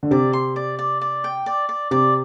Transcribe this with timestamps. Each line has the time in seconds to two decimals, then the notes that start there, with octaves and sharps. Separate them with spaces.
0.03 D3
0.11 C3 D5
0.33 C6
0.56 D5
0.79 D5
1.01 D5
1.24 G5
1.46 D5
1.69 D5
1.91 C3 D5